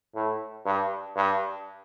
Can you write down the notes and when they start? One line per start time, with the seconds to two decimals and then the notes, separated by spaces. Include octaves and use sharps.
0.15 A2
0.65 G2
1.16 G2